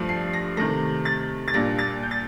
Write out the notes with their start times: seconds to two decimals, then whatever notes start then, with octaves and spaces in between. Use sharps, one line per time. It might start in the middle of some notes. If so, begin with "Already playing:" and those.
Already playing: G2 F3 A3
0.09 C7
0.34 A#6
0.57 C3 D#3 A3 A#6
1.05 A6
1.48 A6
1.54 A#2 G3 A#3 D4 A#6
1.79 A6
2.03 G6
2.11 A6